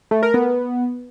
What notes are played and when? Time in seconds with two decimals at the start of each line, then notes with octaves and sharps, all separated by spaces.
0.11 A3
0.23 A#4
0.34 B3